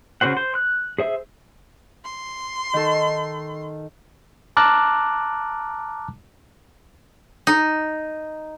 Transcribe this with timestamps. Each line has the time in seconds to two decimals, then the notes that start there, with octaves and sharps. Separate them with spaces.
0.21 C#3 C#4 F#4 C5 F#5
0.37 C5
0.55 F#6
0.98 G#4 C5 E5
2.04 C6
2.73 D#3 A4
4.57 A5 A#5 D6 F6 F#6
7.47 D#4